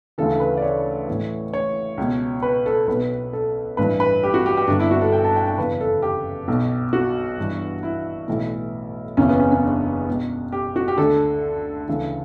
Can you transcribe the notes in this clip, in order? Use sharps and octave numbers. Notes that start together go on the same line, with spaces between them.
D2 C#3 E3 A4
B4
D5
C#5
A1 A2 E3
C#5
C#2 B2
B4
A4
B1 B2 B4
A4
A1 G2 E3 B4
B4
G4
F#4
G4
G4
G1 G2 D3 D4
E4
F#4
A4
G5
A5
G5
G5
F#1 E2 C#3 E3 B4
A4
G4
B1 B2
F#4
G1 G2 E3
E4
B1 A2 E3
F#1 E2 C#3 E3 C#4
B3
C#4
C#4
D4
C#2 B2
G4
F#4
G4
D2 D3 A4
D2 C#3 E3